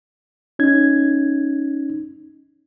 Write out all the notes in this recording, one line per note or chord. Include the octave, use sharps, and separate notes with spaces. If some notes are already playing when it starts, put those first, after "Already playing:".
C#4 D#4 G#6